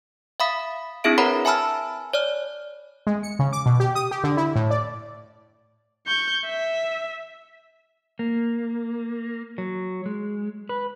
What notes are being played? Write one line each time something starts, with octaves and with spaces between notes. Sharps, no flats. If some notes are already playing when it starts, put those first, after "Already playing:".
E5 F5 B5 D#6 B6
C4 D4 E4 G#4 E5 D7
A#4 B4 C#5 F#5 A#5 B5
E5 G#5 A5 B5 E6 F6
C#5 D5 F6
G#3
C#7
C#3
D6
B2
G4
D#6
G4
D3
E4
A2
D5
C#6 G6
E5
A#3
F#3
G#3
B4